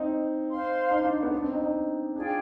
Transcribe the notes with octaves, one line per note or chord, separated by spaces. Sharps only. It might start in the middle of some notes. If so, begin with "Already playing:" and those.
Already playing: C4 D#4
C5 F5 C6
D#4
D4
B3
D4
C4
D#4
D#4
D4 F4 G#4 D5 G5